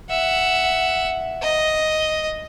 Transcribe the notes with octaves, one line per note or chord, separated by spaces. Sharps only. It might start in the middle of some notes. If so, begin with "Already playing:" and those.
E5 F#5
D#5